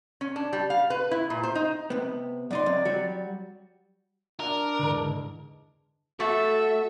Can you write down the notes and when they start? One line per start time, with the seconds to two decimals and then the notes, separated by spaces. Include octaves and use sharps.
0.21 C#4
0.36 D4
0.53 G3
0.70 F5
0.90 B4
1.11 E4
1.30 A#2
1.43 C5
1.55 D#4
1.90 C3 B3
2.51 F#2 D#4 D5 C6
2.66 F#2 C3
2.85 F#3 G3 F#4
4.40 D4 A#4
4.78 E2 G#2 D3
6.20 A3 F#4 A4 E5